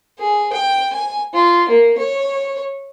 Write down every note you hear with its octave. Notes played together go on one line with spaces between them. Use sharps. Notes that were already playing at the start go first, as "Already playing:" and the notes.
G#4
G5
G#5
F4
A#3
C#5